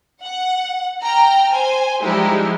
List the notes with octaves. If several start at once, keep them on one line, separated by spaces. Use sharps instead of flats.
F#5
G5 A#5 F6
C5 G#5
F3 G3 G#3 D#4 E4 G4